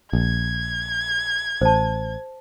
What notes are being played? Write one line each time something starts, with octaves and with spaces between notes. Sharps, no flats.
A#1 G#6
A1 C5 A5